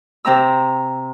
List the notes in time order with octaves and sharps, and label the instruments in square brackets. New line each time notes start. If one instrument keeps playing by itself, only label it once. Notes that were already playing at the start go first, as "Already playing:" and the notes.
[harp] C3 C4 A#5 E6